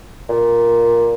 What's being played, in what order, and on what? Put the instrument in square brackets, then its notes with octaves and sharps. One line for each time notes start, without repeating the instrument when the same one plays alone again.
[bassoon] A#2